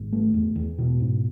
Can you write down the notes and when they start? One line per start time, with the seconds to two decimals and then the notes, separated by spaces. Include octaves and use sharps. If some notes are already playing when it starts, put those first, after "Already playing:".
Already playing: G#1
0.13 A3
0.34 E2
0.56 E2
0.78 B2
1.00 G#2